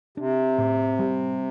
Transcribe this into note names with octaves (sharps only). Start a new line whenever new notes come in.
C3 D4
A2
G3